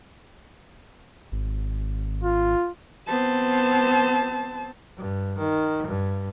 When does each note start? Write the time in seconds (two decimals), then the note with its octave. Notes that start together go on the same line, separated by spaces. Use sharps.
1.32 G#1
2.23 F4
3.07 B3 C4 C5 A5
4.96 G2
5.38 D#3
5.87 G2